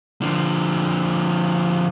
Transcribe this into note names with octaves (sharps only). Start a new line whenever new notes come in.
D3 F3